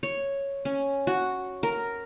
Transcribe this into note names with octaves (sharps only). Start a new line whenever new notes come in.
C#5
C#4
F#4
A#4